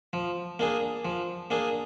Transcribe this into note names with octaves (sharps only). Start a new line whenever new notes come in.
F3
A#3 D4 G#4
F3
A#3 D4 G#4